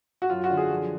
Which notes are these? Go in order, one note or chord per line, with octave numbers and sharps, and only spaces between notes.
F#4
F#2 F4
F#4
D3
G#4
F3